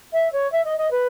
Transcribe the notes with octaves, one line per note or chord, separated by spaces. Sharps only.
E5
C#5
E5
D#5
D#5
B4